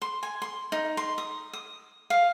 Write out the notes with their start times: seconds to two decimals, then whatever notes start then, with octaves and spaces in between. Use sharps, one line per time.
0.02 C6
0.23 G#5
0.42 C6
0.72 D#4
0.97 C6
1.18 D#6
1.53 D#6
2.10 F5